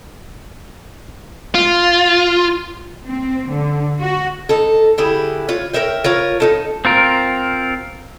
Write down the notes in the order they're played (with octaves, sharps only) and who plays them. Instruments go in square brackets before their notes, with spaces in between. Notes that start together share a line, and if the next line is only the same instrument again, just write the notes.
[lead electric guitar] F4
[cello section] C4
D3
F#4
[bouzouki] D#4 A4
D3 E4 G4 G#4
F4 C#5
A#4 C#5 E5 G5
F4 A#4 C#5
D#4 E4 A4
[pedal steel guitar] C4 F4 A#4